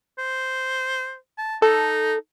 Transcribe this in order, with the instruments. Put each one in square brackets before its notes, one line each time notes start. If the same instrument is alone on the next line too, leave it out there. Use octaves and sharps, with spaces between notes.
[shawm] C5
A5
[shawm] D#4 [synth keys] A4